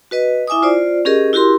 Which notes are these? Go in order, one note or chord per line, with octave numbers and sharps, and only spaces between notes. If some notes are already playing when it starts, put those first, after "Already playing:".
F#4 B4 D#5
E4 E5 G#5 D6 D#6
F4 C5 D5
C#4 G4 G#4 A#4 D#5
E4 F#4 G4 A#4 C6